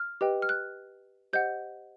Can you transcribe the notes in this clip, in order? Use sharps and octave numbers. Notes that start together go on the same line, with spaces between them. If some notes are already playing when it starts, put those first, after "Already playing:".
Already playing: F6
G4 B4 D#5 G5
F6
F#6
G4 C5 D#5 F#5 G6